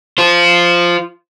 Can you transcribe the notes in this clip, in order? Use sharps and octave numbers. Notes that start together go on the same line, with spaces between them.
F4 C5